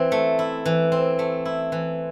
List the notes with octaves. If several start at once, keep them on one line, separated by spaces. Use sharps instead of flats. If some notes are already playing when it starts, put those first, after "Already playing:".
Already playing: E3 C4
A3
E4
E3
C4
A3
E4
E3